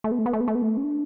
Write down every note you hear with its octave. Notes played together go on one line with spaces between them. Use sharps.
A3
B3
A3
B3
A3
B3
A3
B3
A3
C#4
D4